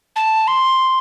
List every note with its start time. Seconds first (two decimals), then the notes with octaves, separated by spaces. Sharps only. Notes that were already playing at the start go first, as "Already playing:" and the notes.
0.16 A5
0.48 C6